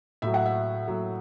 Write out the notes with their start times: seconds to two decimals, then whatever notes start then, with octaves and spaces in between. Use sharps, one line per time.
0.22 A2 F#3 E5
0.34 F#5
0.46 E5
0.88 A2 F#3